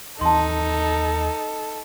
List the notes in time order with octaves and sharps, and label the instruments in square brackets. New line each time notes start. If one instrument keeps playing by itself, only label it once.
[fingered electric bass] D#2 E3 C4 [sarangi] D#4 [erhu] A4 [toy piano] A5 C6